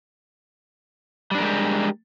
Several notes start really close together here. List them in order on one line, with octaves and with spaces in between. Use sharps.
G3 D4 A#4 G#3 G4